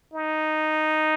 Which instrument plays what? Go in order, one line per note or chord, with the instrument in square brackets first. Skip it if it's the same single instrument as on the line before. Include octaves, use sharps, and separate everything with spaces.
[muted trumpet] D#4